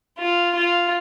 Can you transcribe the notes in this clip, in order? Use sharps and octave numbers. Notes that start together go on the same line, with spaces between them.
F4
F4